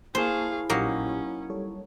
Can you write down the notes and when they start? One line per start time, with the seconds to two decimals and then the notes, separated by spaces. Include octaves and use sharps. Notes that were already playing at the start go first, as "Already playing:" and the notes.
0.15 A#3 E4 G#4 C5 F5 A5 C#6
0.69 A#1 A#2 F#3 A#3 C#4 D#4 G4
1.50 G3 A4 C#5